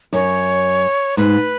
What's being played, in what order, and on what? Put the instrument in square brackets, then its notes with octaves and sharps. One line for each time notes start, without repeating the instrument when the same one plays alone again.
[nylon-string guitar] F#2 [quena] C#5
[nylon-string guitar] G#2 [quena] B4